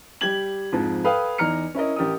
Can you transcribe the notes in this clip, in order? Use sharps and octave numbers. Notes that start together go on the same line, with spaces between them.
G3 G4 G#6 F#7
F2 G#2 F3
A4 B4 F5 G5 D#6
E2 D#4 A#5 F6 C#7
C#4 E4 A#4 D#5
A1 G4 A#4 D#6